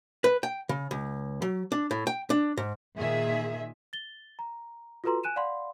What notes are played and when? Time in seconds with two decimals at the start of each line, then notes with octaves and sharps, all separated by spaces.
0.24 B4
0.43 G5
0.69 C#3
0.91 C#2
1.42 F#3
1.72 D4
1.91 A2
2.07 G5
2.30 D4
2.57 G#2
2.97 A#2 D#3 G#4 E5
3.93 A6 G7
4.39 A#5
5.04 F4 F#4 A4 B4 A#5 C6
5.23 G#5 F#6 D#7 E7
5.36 D5 F5 F#5 B5 C6